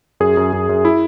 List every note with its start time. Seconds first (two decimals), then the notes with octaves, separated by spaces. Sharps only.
0.20 F#2 G#4
0.37 F#2
0.53 F#2
0.69 F#2
0.85 E4